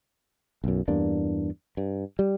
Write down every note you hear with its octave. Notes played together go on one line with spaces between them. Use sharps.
B1 F#2
E2 G2 A#3 D4
G2
G3